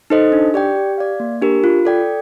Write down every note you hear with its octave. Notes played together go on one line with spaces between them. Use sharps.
D#4 A4 C5 D#5
D4
G4 D5 G5
G4
D5 F5
A#3
D4 G4 A#4
F4
A4 D5 G5